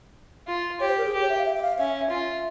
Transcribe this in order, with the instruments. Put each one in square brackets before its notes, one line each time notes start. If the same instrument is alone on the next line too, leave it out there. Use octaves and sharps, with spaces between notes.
[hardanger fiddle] F4
[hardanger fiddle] G4 [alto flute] C#5
[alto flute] C5
A#4
G#4
[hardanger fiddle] G4
[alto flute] C#5
E5
F5
E5
E5
F5
[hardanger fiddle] C#4 [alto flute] E5
[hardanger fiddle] F4 [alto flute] E5